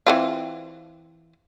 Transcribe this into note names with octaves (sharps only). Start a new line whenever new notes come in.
E3 C4 F4